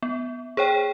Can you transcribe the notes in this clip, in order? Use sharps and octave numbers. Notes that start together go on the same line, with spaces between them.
B3
G#4 C5 C#5 G5